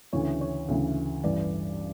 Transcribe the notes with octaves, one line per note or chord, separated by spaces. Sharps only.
D2 C#3 E3 C#5
C#5
D2 C#3 E3
A1 G2 E3 B4 D5